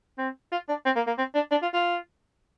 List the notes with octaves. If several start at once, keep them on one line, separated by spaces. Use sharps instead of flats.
C4
F4
D4
C4
A#3
A#3
C4
D4
D4
F4
F4